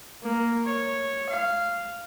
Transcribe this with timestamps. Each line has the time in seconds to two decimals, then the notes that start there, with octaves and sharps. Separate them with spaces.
0.23 A#3
0.65 C#5
1.30 F5